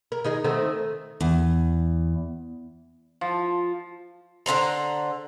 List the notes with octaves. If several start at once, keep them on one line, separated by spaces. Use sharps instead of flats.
A#4
D#3 D#4 G#4
D#3 A3 C4
E2
F3
D3 F4 C5 A#5